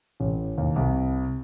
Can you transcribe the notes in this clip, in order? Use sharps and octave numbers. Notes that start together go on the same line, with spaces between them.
A1
D#2
C2